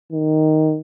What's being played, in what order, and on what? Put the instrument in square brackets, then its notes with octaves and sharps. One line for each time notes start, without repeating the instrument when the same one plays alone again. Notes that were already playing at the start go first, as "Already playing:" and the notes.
[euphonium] D#3